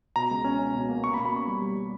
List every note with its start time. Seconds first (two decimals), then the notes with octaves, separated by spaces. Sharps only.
0.16 B2 A#5
0.31 C#2
0.44 C#4
0.59 C#4
0.74 B2
0.89 A#3
1.04 A#3 C#6
1.14 B5
1.19 B2
1.25 B5
1.32 C#4 C#6
1.47 G3
1.61 G3
1.76 G3